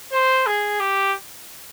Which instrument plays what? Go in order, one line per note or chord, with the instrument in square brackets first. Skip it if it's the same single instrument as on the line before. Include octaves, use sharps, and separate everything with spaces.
[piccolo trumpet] C5
G#4
G4